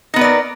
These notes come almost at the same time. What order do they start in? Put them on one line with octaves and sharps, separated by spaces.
D#4 B3 B4 D5 A#4